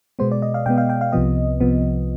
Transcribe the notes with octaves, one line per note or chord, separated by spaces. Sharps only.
B2 G#3 B3 C5
D5
D#5
F5
B2 G#3 B3 G5
F5
G5
F5
C2 C3 F3 B3 D#5
C2 C3 F3 B3